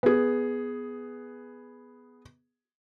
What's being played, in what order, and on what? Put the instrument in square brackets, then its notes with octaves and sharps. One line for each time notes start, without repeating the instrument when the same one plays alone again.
[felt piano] B3 G#4